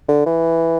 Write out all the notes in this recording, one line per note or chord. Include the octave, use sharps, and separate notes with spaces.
D3
E3